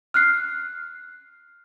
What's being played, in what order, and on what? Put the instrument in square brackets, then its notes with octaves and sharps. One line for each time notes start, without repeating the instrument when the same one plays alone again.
[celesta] F6 F#6 C7